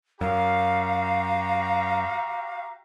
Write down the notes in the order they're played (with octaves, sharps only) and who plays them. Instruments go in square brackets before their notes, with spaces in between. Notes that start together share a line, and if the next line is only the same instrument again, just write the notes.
[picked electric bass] F#2 [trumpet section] F#4 G4 A#5 [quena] F5